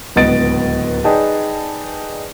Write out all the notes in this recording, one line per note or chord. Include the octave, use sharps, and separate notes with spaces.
D1 C#2 B3 D#5 A6 D7
D#4 G#4 B4 D5 G5 A5